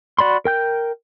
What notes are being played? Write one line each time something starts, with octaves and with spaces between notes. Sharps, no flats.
F#4 D5 B5 C6
A#4 G5 G6